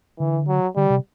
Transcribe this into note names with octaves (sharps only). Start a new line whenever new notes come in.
D3 E3
F#3
D3 G3
C3